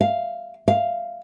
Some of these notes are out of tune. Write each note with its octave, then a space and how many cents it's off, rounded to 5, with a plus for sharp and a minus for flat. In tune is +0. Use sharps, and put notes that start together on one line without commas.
F5 -5
F5 -5